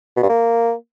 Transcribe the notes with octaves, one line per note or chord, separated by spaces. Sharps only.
B2
G2
A#3